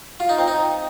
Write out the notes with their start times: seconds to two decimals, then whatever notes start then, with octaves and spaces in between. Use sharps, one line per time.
0.20 F4
0.29 D#4
0.38 C4
0.48 D#4